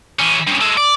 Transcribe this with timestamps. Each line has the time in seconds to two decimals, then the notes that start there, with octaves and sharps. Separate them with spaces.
0.19 E3 C#4
0.47 G2 C#3
0.61 G#3 A4
0.77 D5